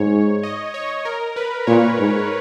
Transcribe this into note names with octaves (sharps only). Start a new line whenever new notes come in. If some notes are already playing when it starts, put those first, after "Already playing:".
Already playing: G#2 C#5
D#5
C#5
A#4
B4
A#2 C#5
G#2